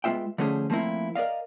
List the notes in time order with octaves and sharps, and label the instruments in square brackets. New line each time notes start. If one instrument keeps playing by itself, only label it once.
[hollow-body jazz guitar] G#3 B3 F4 E5 G5
D3 F3 A3 C#4 G#4 C5
F3 A3 A#3 C4 E4
A#4 D5 D#5 F5